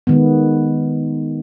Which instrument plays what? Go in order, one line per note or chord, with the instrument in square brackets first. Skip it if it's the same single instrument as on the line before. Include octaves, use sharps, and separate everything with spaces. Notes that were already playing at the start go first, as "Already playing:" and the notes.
[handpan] D#3 G#3 B3